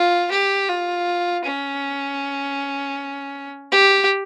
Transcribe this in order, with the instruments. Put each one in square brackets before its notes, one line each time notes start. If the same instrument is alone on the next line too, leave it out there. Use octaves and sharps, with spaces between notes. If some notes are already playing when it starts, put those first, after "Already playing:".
Already playing: [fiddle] F4
G4
F4
C#4
G4